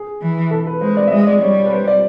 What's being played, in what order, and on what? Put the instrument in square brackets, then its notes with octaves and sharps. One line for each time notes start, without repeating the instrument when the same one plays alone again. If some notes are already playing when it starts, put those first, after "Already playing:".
Already playing: [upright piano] G#4
[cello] E3
[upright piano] A4
B4
[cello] G#3 [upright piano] C5
[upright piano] D5
E5
[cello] G#3 [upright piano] D#5
[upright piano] D5
[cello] G3 [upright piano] C#5
[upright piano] C#5
B4
C5
D5